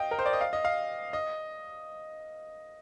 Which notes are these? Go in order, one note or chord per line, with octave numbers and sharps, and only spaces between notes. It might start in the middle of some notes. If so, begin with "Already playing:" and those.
Already playing: D#5 F5 G5
A#4
C5
D5
D#5
F5
D#5
F5
D#5